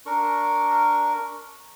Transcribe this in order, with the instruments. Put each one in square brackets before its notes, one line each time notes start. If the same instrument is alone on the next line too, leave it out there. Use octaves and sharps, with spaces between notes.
[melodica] D4 A#4 C#6